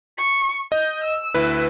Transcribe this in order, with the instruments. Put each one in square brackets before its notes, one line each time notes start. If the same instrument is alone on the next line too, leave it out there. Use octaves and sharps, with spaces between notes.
[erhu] C#6
[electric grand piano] D#5 [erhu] G6
[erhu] E6
[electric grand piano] D2 E4 B4